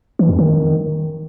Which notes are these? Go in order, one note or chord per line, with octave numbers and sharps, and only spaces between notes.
E3
F2
D#3